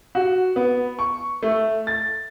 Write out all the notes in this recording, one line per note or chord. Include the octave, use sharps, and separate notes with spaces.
F#4
B3
C#6
A3
A6